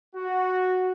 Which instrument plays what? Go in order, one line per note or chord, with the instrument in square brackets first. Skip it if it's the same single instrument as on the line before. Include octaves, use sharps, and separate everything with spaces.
[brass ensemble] F#4